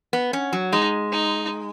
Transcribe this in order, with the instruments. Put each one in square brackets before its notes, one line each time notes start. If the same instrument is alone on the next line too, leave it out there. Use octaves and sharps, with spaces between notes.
[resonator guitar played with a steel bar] B3
C#4
F#3
[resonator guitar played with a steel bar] G#3 [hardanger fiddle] D#4
[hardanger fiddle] D#4